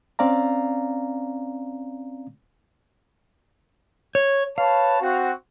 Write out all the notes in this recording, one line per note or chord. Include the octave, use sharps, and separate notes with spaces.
C4 C#4 D5 F5 A#5
C#5
B4 C#5 F5 A5
C4 F#4